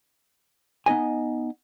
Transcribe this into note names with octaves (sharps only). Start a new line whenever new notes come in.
B3 D#4 D#5 G#5